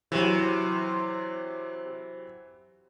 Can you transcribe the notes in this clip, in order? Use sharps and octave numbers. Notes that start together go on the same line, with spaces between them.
C3 E3 F#3